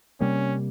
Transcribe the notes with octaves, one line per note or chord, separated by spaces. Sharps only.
C3 G3 A#3 C#4